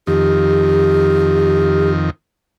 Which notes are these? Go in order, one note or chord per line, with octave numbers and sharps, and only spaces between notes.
F2 D#3 G4